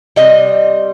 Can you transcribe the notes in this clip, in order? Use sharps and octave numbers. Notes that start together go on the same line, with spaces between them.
C3 G3 D#5